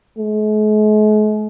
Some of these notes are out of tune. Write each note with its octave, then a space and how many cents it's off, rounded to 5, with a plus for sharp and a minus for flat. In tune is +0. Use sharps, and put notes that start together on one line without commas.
G#3 +45